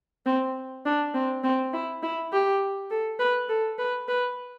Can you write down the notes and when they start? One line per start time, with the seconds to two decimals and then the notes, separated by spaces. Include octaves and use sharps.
0.26 C4
0.85 D4
1.14 C4
1.43 C4
1.73 E4
2.03 E4
2.32 G4
2.90 A4
3.19 B4
3.49 A4
3.79 B4
4.08 B4